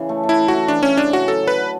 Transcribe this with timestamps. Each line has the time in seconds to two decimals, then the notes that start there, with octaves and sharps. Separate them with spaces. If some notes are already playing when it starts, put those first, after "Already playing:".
Already playing: C#3 E3
0.09 A3
0.23 A3
0.29 E4
0.38 A3
0.48 F#4
0.54 A3
0.68 E3 D4
0.83 C#3 C#4
0.97 C#3 D4
1.13 C#3 F#4
1.28 F#3 A4
1.43 D3 B4
1.58 D3